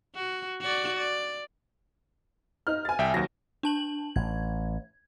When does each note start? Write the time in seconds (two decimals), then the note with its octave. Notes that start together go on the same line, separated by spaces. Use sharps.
0.15 F#4
0.61 F#4 D5
0.97 D5
2.67 D#4 F6
2.85 G#5 A6
2.99 C2 E5 G5
3.14 D#2 F#3 A#6
3.63 D4 A5 F#7
4.16 A1 G#6